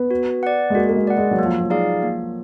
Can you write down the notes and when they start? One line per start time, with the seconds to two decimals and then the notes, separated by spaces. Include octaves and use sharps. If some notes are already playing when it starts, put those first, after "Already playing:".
Already playing: B3
0.11 F#4
0.43 D5 F#5
0.70 G#3
0.75 A#3 F#4
0.89 A#3
0.96 G#3
1.07 D5 F#5
1.17 G#3
1.31 F#3
1.39 A#3
1.46 F3
1.59 F#3
1.70 D#4 G#4 D5 F5
2.03 A#3